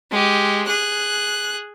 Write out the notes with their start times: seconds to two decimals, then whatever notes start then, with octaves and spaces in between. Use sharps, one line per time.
0.11 G#3 G4
0.68 G#4 F#6